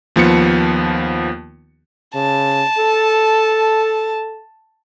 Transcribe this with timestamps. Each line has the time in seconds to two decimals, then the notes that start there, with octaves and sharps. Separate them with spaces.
0.16 D#2 F3 B3 C#7
2.15 C#3 A5
2.78 A4